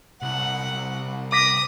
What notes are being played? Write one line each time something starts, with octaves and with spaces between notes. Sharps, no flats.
C2 F#5
D6 D#6 A#6 B6